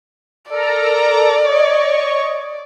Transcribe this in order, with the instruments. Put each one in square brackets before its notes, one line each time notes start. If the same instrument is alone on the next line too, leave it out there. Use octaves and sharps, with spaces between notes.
[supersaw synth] A4 A#4 A#5 [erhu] D5
[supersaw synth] C#5 D#5 C#6